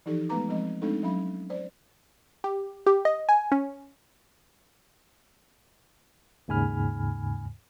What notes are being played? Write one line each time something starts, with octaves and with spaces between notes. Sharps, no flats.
E3 F3 D#4 G4 A4
G#3 A3 B3 B4 A#5 D6
F3 G#3 C4 D#5
G#3 A3 C4 D4 D#4 A4
F#3 C#4 F5 B5
C5 D5
G4
G4
D#5
G#5
C#4
D#2 G#2 C#3 G#5 B5 F6